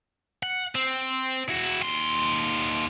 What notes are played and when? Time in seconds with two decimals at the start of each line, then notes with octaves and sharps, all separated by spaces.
0.43 F#5
0.75 C4
1.49 E4 F#4
1.83 D#2 C6